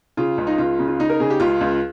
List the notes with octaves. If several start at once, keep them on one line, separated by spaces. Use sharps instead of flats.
C#3 F4
C#2
D#4
C#2 F4
C#3
F4
C#3 D#4
A#4
C#3 G#4
G4
C#2 F4
C#2